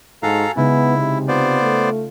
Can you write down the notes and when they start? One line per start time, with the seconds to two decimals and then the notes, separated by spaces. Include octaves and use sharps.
0.23 G#2 F#4 A4 F5 G#5 A#5 A6
0.56 C#3 G#3 B3 D#4 E4
0.98 C3
1.28 B3 F4 C5 D5 G6
1.62 A3